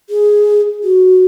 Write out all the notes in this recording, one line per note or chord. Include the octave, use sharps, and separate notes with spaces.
G#4
F#4